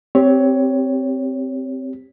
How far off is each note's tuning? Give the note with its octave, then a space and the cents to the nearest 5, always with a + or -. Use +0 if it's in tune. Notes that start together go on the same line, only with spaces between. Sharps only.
C4 +0 G4 +0 C#5 +15